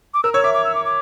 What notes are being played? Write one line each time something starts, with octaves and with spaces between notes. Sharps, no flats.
D6
A#4 E6
C#5 E6
E5 D6
D6
E6
D6
D6